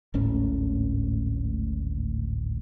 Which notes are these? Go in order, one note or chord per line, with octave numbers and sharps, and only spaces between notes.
D1 G#1 A2 C#4